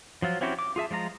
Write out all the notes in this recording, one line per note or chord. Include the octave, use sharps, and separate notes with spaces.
F3 F#3 F4
C4 C#4 E4 F#4 G4
D6
F4 G#4 E5 A5
F3 G#3 F4 A#5